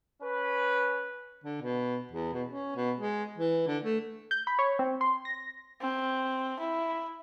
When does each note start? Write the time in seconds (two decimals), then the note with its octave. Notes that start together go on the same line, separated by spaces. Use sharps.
0.23 C#4 B4
1.44 D3
1.62 B2
2.12 E2
2.33 B2
2.48 C#4
2.76 B2
3.00 G#3
3.38 E3
3.67 D3
3.83 A3
4.31 G6
4.47 B5
4.59 C#5
4.79 C4
5.01 C6
5.25 A#6
5.81 C4
6.59 E4